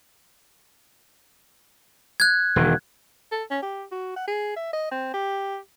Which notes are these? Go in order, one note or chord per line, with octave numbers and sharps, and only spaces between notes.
F#6 G#6
E1 D#3
A4
C#4
G4
F#4
F#5
G#4
E5
D#5
C4
G4